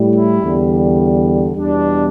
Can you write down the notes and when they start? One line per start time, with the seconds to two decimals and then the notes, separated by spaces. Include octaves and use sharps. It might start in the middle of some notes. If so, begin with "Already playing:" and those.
Already playing: A2 G3
0.14 E4
0.42 E2 D3 G3
1.56 E2 B2 G3 D4